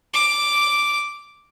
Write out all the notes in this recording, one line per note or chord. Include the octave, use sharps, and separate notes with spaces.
D6